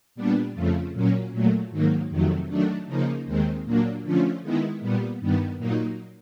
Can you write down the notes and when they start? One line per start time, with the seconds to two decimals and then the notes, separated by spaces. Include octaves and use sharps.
0.15 A#2 G3 B3 D4
0.54 F2 C#3 F3 A3
0.93 A#2 F#3 A#3 C#4
1.32 A#2 F#3 A3
1.70 G#2 D#3 F#3 A#3
2.09 F2 C3 D#3 F#3 A3
2.48 D#3 F#3 A3 D4
2.87 C#3 F3 A#3 D#4
3.26 D#2 D#3 G#3 C4
3.65 A#2 F#3 A#3 D4
4.04 D3 F3 A3 C#4 F4
4.42 D#3 G#3 B3 E4
4.81 A#2 G3 B3
5.20 G2 D#3 G3 B3
5.58 A#2 F#3 A#3 D#4